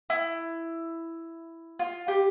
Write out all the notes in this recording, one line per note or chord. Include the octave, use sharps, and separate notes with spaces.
E4
F4
G4